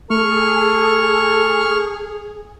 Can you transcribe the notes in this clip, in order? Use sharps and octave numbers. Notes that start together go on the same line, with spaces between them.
A3 G#4 A4 C#6 F6